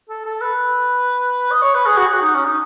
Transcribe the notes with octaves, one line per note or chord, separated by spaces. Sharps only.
A4
A4
B4
D#5
C#5
B4
G#4
F#4
G#4
F#4
D#4
C#4
D#4